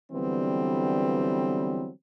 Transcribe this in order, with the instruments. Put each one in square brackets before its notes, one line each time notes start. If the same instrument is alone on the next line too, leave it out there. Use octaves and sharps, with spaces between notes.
[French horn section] D3 E3 F#3 G3 B3 C4